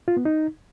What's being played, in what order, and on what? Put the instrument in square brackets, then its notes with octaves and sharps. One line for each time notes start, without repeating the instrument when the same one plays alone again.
[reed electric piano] F4
B3
D#4